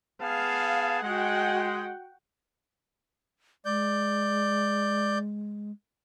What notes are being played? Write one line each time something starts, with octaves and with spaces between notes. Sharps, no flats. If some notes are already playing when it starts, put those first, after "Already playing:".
B3 G#4 F5 A5
G#3 F#4 F#5 G5
G#3 D5 G6